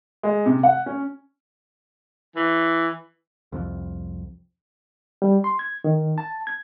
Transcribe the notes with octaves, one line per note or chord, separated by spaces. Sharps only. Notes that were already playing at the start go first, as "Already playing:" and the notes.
G#3
C3
F#5
C#4
E3
C2 F2
G3
C6
G#6
D#3
A5
G#6